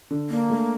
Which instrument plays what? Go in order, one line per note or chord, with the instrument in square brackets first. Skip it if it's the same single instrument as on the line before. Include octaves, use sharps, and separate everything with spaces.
[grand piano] D3
[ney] A#3 [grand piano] D4
[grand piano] A3